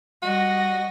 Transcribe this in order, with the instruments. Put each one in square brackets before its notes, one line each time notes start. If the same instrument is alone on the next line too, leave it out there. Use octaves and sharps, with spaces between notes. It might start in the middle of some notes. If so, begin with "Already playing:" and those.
[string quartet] G3 D#5 A#6 [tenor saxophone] F#4